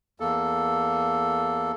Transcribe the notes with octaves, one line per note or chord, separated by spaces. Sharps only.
E2 A#3 A4